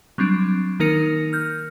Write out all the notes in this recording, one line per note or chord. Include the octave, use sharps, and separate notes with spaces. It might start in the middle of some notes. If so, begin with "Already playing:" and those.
F#3 G3 C4 D4
D#3 A#3 D#4 A#4 A#6 C#7
F6 G6